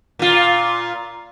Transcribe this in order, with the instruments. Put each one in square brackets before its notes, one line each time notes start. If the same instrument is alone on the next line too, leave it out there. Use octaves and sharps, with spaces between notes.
[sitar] A#2 F4